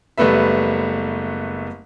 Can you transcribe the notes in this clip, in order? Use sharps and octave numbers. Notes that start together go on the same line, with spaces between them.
F#1 G3 A3 B3 B4 E5